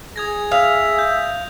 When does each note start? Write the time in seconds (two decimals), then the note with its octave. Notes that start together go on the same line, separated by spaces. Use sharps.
0.16 G#4 D#6 G#6 A#6
0.52 E5 F5 D#6 F7
0.99 G6